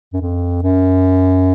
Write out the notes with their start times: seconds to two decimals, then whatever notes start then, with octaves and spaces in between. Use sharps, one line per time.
0.13 F#2
0.22 F2
0.63 F#2